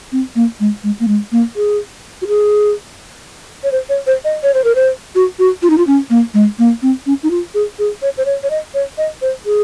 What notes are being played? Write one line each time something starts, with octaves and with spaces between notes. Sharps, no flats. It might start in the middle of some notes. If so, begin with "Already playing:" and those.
C4
A#3
G#3
G#3
A#3
G#3
A#3
G#4
F#4
G#4
C#5
C5
C#5
C5
D#5
C#5
C5
A#4
C5
F#4
F#4
F4
D#4
F4
C#4
A#3
G#3
A#3
C4
C#4
D#4
F4
G#4
G#4
C#5
C5
C#5
C#5
D#5
C#5
D#5
C5
G#4